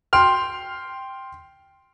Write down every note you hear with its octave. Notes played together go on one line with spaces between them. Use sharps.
G5 C6 F6